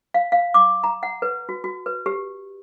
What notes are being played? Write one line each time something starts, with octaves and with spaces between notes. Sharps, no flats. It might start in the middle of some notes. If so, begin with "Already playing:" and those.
F5
F5
D6
A#5
F#5
B4
F#4
F#4
B4
G4